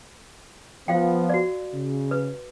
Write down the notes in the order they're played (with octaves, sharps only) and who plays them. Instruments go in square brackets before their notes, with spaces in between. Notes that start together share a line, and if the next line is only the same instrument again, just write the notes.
[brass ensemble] F3 B3 [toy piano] C5 F5 G5
[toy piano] F#4 D5
[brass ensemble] C#3
[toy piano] B4